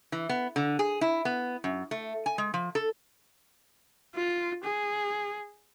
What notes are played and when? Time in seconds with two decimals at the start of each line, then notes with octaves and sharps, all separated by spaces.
0.12 E3
0.29 B3
0.56 D3
0.79 G#4
1.01 E4
1.25 B3
1.64 F#2
1.91 A3
2.26 G#5
2.38 G#3
2.54 F3
2.75 A4
4.16 F4
4.64 G#4